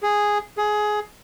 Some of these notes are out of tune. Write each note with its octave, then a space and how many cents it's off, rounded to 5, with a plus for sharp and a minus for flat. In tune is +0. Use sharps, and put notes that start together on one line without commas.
G#4 -5
G#4 +15